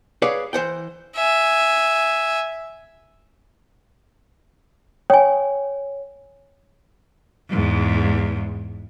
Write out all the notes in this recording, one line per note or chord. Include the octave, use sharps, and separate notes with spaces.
G#4 B4 C#5 D5 F5 F#5
E3 C5 F#5 G5
E5 G#5
C#5 G5 G#5
E2 G#2